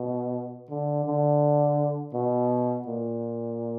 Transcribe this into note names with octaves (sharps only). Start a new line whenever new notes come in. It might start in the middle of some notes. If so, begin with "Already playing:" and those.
Already playing: B2
D3
D3
B2
A#2